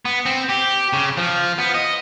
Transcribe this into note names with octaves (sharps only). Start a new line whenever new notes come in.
B3
C4
G4
C#3
F3
B3
D#5